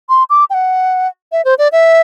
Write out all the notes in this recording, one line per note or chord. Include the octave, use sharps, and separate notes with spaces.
C6
D6
G5
F#5
E5
C5
D5
E5